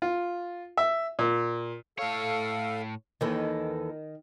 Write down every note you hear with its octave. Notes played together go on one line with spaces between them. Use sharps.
F4
E5
A#2
A2 A4 C#5 F5
D#2 D#3 E3 A4